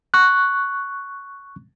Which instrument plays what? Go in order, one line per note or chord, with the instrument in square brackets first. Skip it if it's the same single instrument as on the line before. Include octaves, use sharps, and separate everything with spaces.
[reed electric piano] C#6 F#6